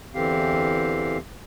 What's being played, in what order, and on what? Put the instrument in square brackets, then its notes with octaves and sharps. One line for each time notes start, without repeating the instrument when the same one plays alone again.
[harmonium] E2 D3 E3 C4 G4 F5